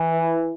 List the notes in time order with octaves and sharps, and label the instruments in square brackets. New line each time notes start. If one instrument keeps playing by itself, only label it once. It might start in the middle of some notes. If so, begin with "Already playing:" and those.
Already playing: [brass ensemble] E3